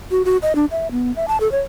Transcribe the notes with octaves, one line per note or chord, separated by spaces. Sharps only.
F#4
F#4
D#5
D4
E5
B3
E5
A5
A4
C#5